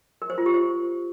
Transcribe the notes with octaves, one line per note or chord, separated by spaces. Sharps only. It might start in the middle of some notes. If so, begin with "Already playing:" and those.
A#4
C5
F4
G4
C5